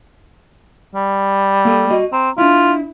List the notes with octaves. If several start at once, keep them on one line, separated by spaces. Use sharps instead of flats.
G3
A#3 A4
F#4 D#5
C4 A#5
D4 E4 F4